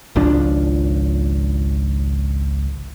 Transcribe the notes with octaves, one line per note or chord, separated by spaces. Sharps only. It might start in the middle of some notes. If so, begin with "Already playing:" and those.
G#1 C#2 F3 D4